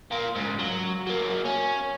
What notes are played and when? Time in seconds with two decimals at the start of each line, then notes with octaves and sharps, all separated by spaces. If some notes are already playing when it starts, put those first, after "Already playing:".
0.12 A#3 F4
0.36 G#2 C#3
0.59 F#3
1.07 F#3 A#3
1.45 C#4